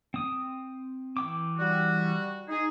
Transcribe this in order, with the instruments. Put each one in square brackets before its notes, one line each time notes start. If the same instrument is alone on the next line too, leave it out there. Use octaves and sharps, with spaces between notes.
[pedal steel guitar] C4 D#6
E3 G5 D6
[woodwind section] G3 F#4
D#4 G#4